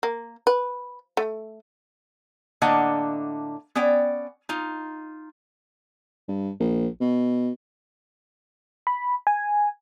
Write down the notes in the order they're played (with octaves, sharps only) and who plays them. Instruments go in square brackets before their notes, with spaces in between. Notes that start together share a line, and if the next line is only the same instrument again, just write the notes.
[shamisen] A#3
B4
A3
[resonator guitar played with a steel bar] A2 D3 A#3 D4 D#5 F#5
B3 C#4 D5 G5
D#4 F4
[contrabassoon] G2
A#1
B2
[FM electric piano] B5
G#5